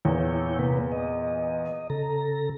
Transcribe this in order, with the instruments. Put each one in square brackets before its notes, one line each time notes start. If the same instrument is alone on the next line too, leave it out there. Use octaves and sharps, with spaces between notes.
[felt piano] E2 A#2 [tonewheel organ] E4 C#5 G5
[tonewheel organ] C3 A#3 B4
D#5
C#3 A4 A#5